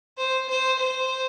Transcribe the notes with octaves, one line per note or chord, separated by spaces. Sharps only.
C5
C5
C5